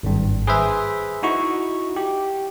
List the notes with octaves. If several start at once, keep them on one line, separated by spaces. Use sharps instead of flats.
G#1 G2
G#4 B4 C5 E5
D#4 E4 F#4 C#6
G4